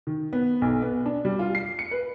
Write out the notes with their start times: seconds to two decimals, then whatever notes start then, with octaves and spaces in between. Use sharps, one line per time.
0.07 D#3
0.33 B3
0.62 B1
0.82 B3
1.06 D4
1.25 G3
1.39 F4
1.55 C7
1.79 C#7
1.91 B4